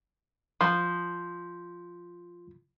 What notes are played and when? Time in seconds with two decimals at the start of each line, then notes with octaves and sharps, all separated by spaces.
0.61 F3 C6 G6